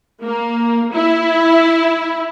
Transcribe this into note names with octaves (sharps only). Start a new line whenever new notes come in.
A#3
E4